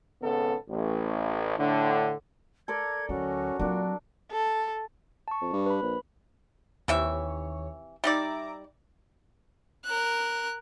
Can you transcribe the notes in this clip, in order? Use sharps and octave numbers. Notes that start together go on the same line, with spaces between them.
G#1 C#3 B3 A4
A1
A2 D3
A4 A#4 D5 G#6
D2 F#3 C#4 F#4
A#2 F#3 C4 D4
A4
A5 C#6
F2
G2
B4 B5
A#1
D#2 C3 E3 C#5 E5
G3 D#4 D5 E5 A#5 D6
A#4 F#6